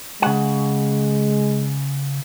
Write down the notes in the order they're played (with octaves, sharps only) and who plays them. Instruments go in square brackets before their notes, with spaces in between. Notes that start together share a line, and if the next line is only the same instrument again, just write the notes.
[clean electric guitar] C#3 F#5 [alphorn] G#3